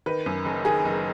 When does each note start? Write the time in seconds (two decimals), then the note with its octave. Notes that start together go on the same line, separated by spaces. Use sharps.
0.06 D#3 B4
0.26 F#2
0.45 F#1
0.65 D#3 G#4
0.85 F#1